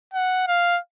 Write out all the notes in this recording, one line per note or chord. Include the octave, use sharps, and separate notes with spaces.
F#5
F5